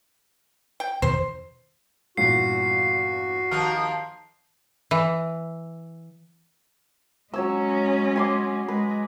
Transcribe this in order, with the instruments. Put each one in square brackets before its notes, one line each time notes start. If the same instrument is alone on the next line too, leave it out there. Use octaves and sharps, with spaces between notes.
[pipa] G5
[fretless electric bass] E2 B2 D#3 [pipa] C5
[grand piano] E2 G2 A#2 [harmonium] F#4 [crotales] C7
[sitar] D#2 F3 A#4 [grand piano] F6 F#6
[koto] E3
[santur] F#3 C#5 E6 [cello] G#3 C#4
[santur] G#5 C6 D6
[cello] G#3 [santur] B4